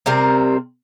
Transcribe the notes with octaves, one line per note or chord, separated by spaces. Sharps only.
C3 G3 C4 A#4